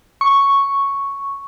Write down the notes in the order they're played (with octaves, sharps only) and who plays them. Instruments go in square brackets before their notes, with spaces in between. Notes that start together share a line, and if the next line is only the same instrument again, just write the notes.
[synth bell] C#6